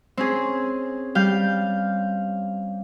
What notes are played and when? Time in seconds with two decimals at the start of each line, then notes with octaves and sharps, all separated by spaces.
0.17 C4 C#4 G#4
1.15 G3 F5 G6